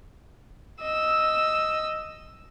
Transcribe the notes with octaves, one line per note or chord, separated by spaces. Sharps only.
D#5 E6